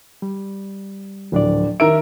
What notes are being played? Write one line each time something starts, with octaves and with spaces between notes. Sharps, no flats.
G3
D1 F3 D4 D5
D#3 A#4 E5 E6 D7